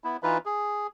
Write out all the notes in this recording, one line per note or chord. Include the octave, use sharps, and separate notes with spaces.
B3 E4
E3 D#4 F4 B4
G#4